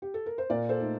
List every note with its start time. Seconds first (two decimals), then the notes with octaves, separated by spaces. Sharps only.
0.02 G4
0.14 A4
0.26 A#4
0.38 C5
0.50 A#2 A#4 D5
0.69 A4 C5
0.80 A3 D#4